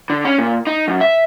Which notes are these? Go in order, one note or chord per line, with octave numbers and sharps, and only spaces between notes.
D3
C#4
A#2
D#4
F#2
E5